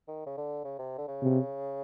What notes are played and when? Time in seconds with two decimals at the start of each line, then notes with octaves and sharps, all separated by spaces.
0.08 D#3
0.26 C#3
0.37 D3
0.65 C#3
0.79 C3
0.98 D3
1.08 C#3
1.22 C3